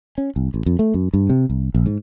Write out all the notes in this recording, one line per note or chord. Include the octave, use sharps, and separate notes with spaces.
C#4
C2
A1
F2
A3
F#2
G2
C3
C2
A#1
G#2